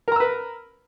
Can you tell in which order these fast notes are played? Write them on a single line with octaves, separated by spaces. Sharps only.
A#4 A#5 E6 B4